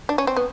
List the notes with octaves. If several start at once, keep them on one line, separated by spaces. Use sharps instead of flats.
D4
C#4
C4
B3